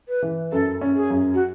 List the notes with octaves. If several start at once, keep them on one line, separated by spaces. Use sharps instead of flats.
B4
E3
F#2 A4
C#4
G#4
F#2
F#4